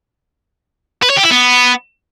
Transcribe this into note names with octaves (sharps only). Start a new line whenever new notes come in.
B4
C#5
G4
E4
B3